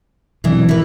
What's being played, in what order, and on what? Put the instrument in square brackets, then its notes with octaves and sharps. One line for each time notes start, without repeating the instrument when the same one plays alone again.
[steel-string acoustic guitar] D2 E3 [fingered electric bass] B2 F#3 C4
[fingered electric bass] D#3 F3 [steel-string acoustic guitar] E4 A#4 B4